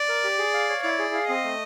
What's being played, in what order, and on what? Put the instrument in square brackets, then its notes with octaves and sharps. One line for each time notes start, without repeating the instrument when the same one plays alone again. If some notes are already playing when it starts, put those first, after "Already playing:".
Already playing: [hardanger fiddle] D5
[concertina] A#4
G4
G#4
F5
C#5
[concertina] E4 [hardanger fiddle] D5
[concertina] G#4
F5
[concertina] C4 [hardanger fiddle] D#5
[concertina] A3